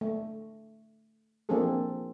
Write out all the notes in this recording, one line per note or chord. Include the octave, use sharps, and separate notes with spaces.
A3
F3 A#3 C4 D4 G#4 A4